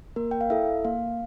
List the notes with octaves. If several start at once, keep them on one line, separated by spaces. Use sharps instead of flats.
A#3 A#4
G5
F5
E4 A4 E5
A#3 F5